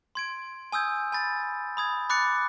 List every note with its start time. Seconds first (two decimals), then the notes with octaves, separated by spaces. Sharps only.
0.15 C6 G#6 D7
0.72 G#5 D#6 E6 G6 G#6
1.12 G#5 B5 A6
1.77 B5 D#6 G#6
2.10 B5 D6 F#6 A6 C#7